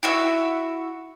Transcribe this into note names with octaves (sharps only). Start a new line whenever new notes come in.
E4 F#4 E5